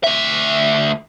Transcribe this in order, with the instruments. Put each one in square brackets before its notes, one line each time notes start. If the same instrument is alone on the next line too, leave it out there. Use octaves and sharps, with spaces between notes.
[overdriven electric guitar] D2 E5